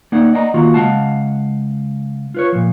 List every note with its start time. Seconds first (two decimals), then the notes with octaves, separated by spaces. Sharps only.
0.12 A#3 D#4 D5 F#5
0.33 D5 D#5 F#5 G#5 A#5
0.54 D#3 A#3 F4 F#4
0.74 C#3 G#3 F5 F#5 A5
2.35 F4 B4 C#5
2.52 A#2 F3